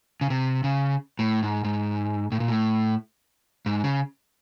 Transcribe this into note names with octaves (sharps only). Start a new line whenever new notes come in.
C#3
C3
C#3
A2
G#2
G#2
A2
A#2
A2
G#2
C#3